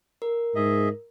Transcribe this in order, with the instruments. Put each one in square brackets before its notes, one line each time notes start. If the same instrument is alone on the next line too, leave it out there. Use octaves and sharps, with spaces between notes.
[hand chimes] A#4
[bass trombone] G#2 [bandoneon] G#4 D#5 E5